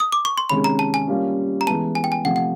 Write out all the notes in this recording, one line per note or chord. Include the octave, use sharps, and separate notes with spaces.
D#6
D6
C#6
C6
C3 D#3 G#3 C#4 B5
A#5
A5
G#5
G3 A#3 C#4 F4
A#5
E3 G#3 B3 A5
G#5
G5
G#5
C3 F3 A3 F#5
F#5